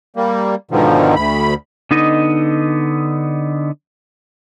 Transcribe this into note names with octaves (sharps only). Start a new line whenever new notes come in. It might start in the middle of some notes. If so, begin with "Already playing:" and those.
G3 A#3
G#2 B2 D3 D#3 F3
D2 B5
D3 B3 D#4 D#5